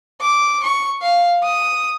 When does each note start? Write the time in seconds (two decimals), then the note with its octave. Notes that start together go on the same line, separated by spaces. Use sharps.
0.21 D6
0.64 C#6
1.02 F5
1.43 D#6